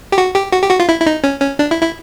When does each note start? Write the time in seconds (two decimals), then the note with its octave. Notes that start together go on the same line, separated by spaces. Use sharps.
0.12 G4
0.18 F#4
0.35 G4
0.53 F#4
0.62 G4
0.70 F#4
0.80 F4
0.89 E4
1.00 E4
1.06 D#4
1.24 C#4
1.41 C#4
1.59 D4
1.71 E4
1.82 E4